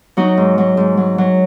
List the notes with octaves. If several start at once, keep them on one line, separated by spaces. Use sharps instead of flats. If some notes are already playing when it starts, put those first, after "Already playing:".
F#3 D#4 F#4
G#2
F#3
G#2
F#3
F#3